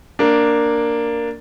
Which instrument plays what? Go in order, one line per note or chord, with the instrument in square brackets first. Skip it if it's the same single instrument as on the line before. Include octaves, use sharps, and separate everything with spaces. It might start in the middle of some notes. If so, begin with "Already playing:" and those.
[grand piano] A#3 D4